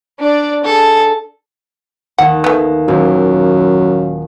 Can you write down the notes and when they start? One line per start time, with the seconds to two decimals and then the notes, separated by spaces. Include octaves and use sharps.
0.19 D4 D5
0.64 G#4 A4
2.18 D#2 F#5
2.44 A3 B3
2.88 D#1 F#2